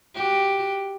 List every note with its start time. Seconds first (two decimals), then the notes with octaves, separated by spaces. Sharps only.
0.15 F#4 G4